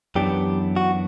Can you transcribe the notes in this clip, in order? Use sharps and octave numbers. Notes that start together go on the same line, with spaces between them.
F#2 E3 B3 D4 G4
F#4